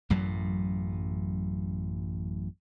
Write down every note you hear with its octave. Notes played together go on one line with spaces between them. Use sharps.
A1 F#2 A2 F#3